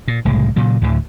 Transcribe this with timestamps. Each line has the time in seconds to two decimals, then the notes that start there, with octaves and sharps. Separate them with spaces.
0.08 A#2
0.25 F#1 C2 A2 G#3
0.56 A#2 C#3 F#3
0.82 D2 A2 D3